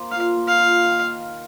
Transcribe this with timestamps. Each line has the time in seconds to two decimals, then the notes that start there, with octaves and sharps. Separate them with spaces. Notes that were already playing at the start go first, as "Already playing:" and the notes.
Already playing: A#3 C5
0.11 F4 F5
0.36 A#3
0.48 F5
0.60 F4
0.84 D#3